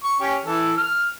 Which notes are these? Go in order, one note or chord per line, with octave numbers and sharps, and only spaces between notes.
C#6
C#4 G4
E3 A4
F6